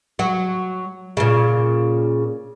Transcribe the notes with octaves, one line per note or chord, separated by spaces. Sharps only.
F#3 F#4
A#2 C#3